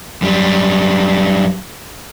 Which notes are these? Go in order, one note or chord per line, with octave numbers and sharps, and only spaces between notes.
F#2 G3